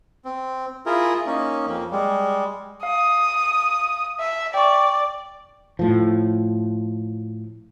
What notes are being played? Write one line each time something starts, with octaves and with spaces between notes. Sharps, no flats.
C4
E4 F4 G#4 A#4
A#3 C#4 D#4
F2 A#3
G3 G#3
F5 D#6
E5
D5 G5 C#6
A2 F3